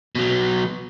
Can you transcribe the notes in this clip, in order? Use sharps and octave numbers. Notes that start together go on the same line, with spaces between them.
B2 F#3